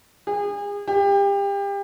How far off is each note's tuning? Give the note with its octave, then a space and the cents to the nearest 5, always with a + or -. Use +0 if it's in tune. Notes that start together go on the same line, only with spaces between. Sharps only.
G#4 -35
G4 +30